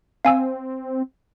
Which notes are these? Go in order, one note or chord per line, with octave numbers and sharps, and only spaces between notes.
C4 F5 G#5 E6